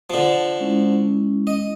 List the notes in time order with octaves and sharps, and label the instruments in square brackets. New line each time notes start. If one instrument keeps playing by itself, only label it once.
[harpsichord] D3 F3
[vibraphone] G#3 C#4 E4
[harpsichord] D#5